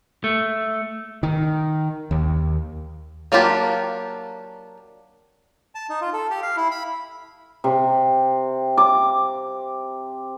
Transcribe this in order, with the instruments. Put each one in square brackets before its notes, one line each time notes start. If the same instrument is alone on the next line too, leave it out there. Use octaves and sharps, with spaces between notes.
[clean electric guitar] A3
[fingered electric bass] D#3
D#2
[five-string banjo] F#3 A#3 D4 F4 G4
[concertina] A5
D#4
F4
A4
G4
F5
E4
B5
[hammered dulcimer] C3
D6